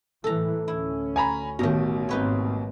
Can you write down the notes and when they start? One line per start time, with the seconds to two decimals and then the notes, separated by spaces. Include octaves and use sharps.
0.24 A2 E3 A4 A#5
0.68 D2 C#4 E4
1.16 G#5 A#5 B5
1.59 A1 B2 D#3 A#5
2.09 G#2 A#3 C4 D#4 B4 C#5